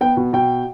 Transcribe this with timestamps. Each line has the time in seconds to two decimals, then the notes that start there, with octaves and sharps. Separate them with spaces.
0.01 B3 G5
0.17 B2
0.33 B2 G5